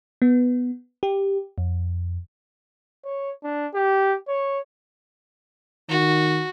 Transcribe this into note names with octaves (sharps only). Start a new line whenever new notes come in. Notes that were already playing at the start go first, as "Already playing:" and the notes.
B3
G4
F2
C#5
D4
G4
C#5
D#3 F#4